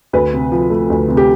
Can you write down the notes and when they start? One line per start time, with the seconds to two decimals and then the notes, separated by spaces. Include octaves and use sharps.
0.13 D2 B4
0.33 C3
0.52 F3
0.70 A3
0.90 D2
1.08 C3
1.17 G4